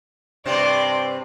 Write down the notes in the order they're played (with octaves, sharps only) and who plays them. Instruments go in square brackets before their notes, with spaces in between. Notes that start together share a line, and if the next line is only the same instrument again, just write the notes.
[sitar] G2 C3 C4 [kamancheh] D5 C6